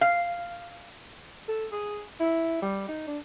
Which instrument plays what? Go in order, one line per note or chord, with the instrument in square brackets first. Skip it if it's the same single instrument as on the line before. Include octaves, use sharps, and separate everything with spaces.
[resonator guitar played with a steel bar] F5
[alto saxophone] A4
G#4
E4
G3
D#4
D4